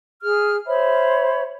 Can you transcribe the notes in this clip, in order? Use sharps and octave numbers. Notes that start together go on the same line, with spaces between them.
G#4 F6
C5 C#5 E5 B5